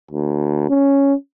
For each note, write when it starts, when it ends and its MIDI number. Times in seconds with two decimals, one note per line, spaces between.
0.11 0.68 38
0.69 1.14 61